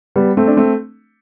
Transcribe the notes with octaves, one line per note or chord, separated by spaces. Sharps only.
G3 B3
A3 C4
D4
A3 C4